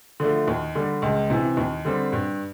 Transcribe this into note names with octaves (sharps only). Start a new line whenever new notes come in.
D3 F3 A3
D#2
D3 G3
C#2
C3 E3
D#2
D3 G3 C4
G2